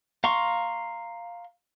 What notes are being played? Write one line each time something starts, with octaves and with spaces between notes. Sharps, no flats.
F5 A#5 C6 C#6